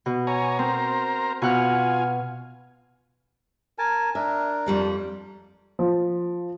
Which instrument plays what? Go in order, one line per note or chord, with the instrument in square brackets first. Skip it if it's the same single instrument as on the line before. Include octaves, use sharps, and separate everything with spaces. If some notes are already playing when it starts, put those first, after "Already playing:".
[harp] B2
[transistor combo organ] C#5 G#5 A#5
[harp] C4 [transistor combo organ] A#4 C5 A#5
[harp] B2 F#5 F6 [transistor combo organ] F4 G#5
[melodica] A#4 G#5 A5
[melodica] D4 A#4 [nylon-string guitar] E5
[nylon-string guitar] F2 G3 A#3
[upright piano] F3